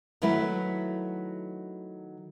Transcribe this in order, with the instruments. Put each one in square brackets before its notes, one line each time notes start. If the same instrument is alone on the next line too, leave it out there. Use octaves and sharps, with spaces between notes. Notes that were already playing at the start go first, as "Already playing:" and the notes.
[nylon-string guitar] D#3 F#3 A3 E4 B4 F#5